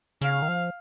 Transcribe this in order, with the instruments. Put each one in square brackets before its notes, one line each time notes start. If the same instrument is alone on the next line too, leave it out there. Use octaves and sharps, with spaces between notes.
[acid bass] C#3 [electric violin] F5
[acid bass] D#3
F3